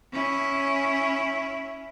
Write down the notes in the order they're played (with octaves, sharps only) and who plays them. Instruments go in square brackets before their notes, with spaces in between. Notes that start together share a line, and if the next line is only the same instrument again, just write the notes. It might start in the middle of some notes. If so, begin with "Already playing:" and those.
[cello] C#4 E4